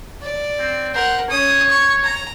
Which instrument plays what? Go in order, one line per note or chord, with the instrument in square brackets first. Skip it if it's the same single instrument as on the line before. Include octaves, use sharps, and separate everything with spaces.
[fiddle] D5
[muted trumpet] C4
[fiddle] A#4 F#5 [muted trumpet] C5
[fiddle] C#4 D#6 [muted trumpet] C#5
[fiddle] C#6
A#5